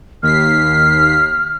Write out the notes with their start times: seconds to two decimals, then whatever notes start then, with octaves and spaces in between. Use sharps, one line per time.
0.23 D#2 F6 B6 C7